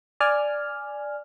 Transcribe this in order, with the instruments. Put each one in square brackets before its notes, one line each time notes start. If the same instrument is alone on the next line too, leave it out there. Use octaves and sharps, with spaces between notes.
[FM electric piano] D5 G#5 F6